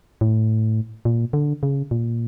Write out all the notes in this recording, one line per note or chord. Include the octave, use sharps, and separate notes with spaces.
A2
A#2
D3
C#3
A#2